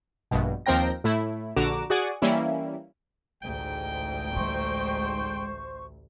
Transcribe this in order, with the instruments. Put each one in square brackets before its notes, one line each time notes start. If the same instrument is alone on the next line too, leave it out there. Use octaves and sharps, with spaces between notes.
[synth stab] A#1 G2 B2
D#2 F3 C4 A#4 G5 A#6
A2 A3 E4
A#1 D3 F#4 A#5 D6 E7
F#4 G#4 D5 F#5 G#5
E3 G3 A#3 C#4 E4
[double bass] A1 D2 [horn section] G#2 G5
[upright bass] G3 G#3 [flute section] C5 C#6